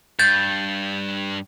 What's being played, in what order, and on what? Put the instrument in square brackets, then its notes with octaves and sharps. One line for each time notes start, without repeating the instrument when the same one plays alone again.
[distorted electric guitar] G2 [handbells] G6 A6